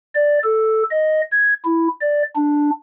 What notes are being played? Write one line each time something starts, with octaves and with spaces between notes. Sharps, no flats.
D5
A4
D#5
G#6
E4
D5
D4